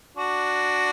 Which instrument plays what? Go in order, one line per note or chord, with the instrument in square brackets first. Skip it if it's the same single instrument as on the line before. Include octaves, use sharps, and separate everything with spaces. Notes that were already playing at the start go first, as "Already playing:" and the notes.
[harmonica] D4 F#4